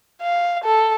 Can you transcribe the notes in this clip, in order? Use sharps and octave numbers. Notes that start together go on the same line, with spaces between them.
F5
A4